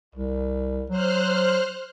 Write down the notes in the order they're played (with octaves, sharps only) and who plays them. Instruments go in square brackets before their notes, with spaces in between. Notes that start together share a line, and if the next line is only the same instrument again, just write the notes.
[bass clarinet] C2
[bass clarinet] F#3 [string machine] C5 F6 F#6